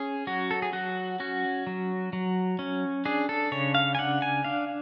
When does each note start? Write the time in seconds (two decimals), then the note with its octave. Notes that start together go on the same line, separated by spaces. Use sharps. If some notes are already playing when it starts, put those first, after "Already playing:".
Already playing: C#4 G#4
0.27 F#3 F#4
0.51 A4
0.62 G#4
0.73 F#3 F#4
1.20 C#4 F#4
1.67 F#3
2.13 F#3
2.59 C#4
3.05 D4 G#4
3.29 A4
3.52 C#3 C#5
3.75 F5
3.95 G#5
3.99 D4 F#5
4.22 G#5
4.44 D4 F5